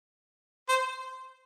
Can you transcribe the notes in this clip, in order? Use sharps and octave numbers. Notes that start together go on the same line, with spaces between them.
C5